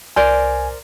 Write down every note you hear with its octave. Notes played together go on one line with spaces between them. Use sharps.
C2 A#4 C5 D5 G#5